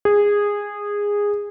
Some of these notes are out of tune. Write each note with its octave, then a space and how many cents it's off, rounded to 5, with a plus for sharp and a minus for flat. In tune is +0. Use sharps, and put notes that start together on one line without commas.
G#4 -15